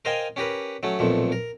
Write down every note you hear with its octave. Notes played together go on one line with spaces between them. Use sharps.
A#4 C5 D#5 F5 G5 G#5
C#4 G4 A#4 B4
F#3 A3 C#4
B1 F2 A#2 F3 A3
A#4